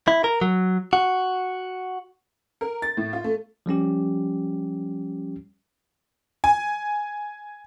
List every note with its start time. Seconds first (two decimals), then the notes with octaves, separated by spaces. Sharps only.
0.08 E4
0.24 A#4
0.41 F#3
0.93 F#4
2.61 A#4
2.82 A6
2.97 A2
3.13 F4
3.24 A3
3.66 F3 G3 C#4 G4
6.44 G#5